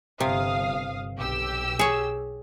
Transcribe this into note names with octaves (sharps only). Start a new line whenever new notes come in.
G1 C3 F5 D#6
B1 G4 E6
G#4 C#5